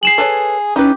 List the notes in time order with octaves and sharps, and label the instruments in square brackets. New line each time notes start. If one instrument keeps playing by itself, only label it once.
[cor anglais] G#4 [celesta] C7 E7 F#7
[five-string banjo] A4 B4 C#5
[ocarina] C#4 [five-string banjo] D#4 E4 B4 [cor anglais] G4